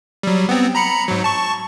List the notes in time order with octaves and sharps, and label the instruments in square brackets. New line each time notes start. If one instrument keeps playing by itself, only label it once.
[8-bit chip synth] F#3 G3
B3 C4
A#5 B5 C#7
G#2 F#3
A5 C#6